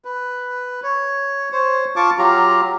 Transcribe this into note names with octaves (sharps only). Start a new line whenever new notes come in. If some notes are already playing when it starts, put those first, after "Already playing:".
B4
C#5
C5 C#5
F4 A5 C#6 D6
F#3 F4 G4 A#5